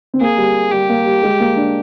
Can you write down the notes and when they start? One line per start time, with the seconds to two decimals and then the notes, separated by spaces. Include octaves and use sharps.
0.14 C4
0.21 A#3 G#4
0.37 G3
0.71 G3 G4
0.89 A#3
1.06 G3
1.23 G#3
1.40 A#3
1.56 D4